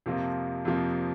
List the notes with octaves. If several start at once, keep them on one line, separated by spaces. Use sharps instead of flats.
F2 C3 F3 A#3 F4
F2 C3 F3 A#3 F4